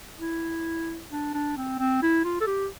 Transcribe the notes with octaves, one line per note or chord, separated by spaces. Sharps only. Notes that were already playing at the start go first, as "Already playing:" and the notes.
E4
D4
D4
C4
C4
E4
F4
A4
G4